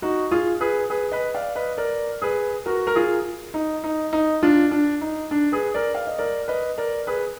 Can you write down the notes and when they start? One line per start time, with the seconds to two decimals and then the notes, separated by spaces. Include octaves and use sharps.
0.02 D#4 F#4
0.31 F4 G#4
0.61 G#4 B4
0.90 G#4 B4
1.12 B4 D#5
1.35 D5 F5
1.56 B4 D#5
1.78 A#4 D5
2.22 G#4 B4
2.66 F#4 A#4
2.87 A#4
2.96 F4 G#4
3.54 D#4
3.84 D#4
4.13 D#4
4.43 D4 F4
4.71 D4
5.01 D#4
5.31 D4
5.52 G#4 B4
5.74 A#4 D5
5.95 F5
6.07 D#5
6.18 A#4 D5
6.48 B4 D#5
6.78 A#4 D5
7.07 G#4 B4